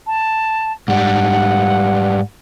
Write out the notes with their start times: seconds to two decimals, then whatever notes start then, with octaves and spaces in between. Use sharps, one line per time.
0.07 A5
0.88 G#2 G3 F#5